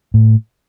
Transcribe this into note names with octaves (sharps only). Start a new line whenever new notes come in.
A2